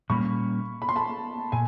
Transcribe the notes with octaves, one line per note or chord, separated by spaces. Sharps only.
A#2 G3 A#3 C#4 B5 C#6
B5
C6
A5 B5
A#2 G#5